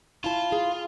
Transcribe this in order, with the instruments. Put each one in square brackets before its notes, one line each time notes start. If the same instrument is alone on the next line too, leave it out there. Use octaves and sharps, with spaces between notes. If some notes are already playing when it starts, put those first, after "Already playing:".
[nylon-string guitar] E4 A5 [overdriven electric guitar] F4
[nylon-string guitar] G#4